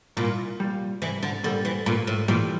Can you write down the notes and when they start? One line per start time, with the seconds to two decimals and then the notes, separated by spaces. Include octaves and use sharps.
0.17 C2 A#2
0.60 A#2 G3
1.02 C2 E3
1.23 D3
1.43 A#2 D3 G3
1.65 E3
1.86 G2 A#2
2.07 A2
2.28 A#2 E3 G3